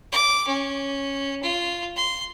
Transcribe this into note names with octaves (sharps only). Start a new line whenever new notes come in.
D6
C#4
F4
C6